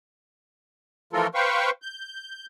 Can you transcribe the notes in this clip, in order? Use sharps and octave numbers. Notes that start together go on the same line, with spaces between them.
E3 F3 A3 F4 A4 A#4
B4 C5 F5 G5 C#6
G6